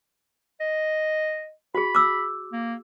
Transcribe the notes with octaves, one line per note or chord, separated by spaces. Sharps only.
D#5
F#4 G#4 B5
D6 E6
A#3